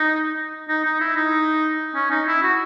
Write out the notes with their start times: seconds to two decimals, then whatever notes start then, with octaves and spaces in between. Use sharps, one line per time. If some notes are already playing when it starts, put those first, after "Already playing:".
Already playing: D#4
0.69 D#4
0.85 D#4
1.00 E4
1.16 D#4
1.95 C#4
2.11 D#4
2.27 E4
2.43 F#4